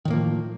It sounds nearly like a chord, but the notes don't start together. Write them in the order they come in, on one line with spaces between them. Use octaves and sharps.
D#3 A2 A#3 F3